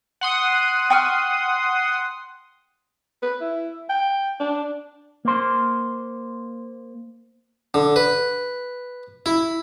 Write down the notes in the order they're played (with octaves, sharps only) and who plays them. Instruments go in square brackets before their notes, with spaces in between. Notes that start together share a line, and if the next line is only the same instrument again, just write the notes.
[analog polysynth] F#5 C6 D#6
[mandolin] G5 C#6 F6
[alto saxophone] B4
E4
G5
D4
[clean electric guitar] A#3 C5
[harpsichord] D3
B4
E4